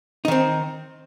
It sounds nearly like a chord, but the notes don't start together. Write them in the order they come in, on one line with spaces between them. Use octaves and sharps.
D#4 D#3 C4